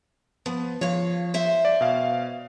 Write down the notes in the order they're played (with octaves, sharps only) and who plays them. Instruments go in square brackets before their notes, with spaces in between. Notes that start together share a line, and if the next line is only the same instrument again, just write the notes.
[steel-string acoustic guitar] F3 [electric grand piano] B3
[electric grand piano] F3 [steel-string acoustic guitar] C#5 F5
[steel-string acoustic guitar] C5 E5
[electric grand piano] D5
B2 F5